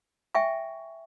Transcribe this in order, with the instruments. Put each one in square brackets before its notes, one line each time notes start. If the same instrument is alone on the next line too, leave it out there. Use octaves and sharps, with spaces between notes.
[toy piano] E5 G5 G#5 C#6